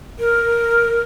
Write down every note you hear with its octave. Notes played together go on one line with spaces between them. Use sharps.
A#4